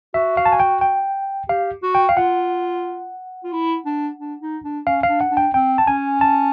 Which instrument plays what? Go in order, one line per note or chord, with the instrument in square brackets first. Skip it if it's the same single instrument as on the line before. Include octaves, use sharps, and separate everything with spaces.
[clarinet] F#4 [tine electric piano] E5
[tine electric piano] F5
A5
G#5
G5
G5
[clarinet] G4 [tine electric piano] F5
[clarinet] F#4
[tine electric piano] G5
F5
[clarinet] F4 [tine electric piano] F#5
[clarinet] F4
E4
D4
D4
D#4
D4
[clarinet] C#4 [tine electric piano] F5
[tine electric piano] F5
[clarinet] D4
[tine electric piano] F#5
[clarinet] D4
[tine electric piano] G5
[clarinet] C4 [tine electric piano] G5
[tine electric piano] A5
[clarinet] C#4 [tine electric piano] G#5
[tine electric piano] A5